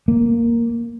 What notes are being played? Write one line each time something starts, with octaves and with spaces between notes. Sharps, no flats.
A#3